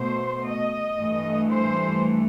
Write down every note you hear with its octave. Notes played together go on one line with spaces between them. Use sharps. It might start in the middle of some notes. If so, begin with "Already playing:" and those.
Already playing: B2 A3 C5
D#5
G2 E3 A3
C5